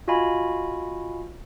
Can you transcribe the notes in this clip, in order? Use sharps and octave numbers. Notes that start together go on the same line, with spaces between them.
F4 F#4 D#5 F5 G#5 B5